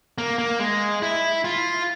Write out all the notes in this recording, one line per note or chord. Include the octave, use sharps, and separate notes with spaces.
A#3
A#3
G#3
E4
F4